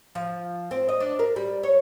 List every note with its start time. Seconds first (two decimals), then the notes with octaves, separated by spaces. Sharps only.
0.15 F3
0.71 C4
0.89 D#5
1.00 D4
1.19 A#4
1.36 G3
1.63 C#5